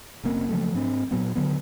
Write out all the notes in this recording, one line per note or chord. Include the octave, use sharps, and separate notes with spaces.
F#1 C#3 A#3 C4
C#3 F3 F#3 A3
G#2 C4 D4
A#2 F#3 B3
D3 E3 F#3 B3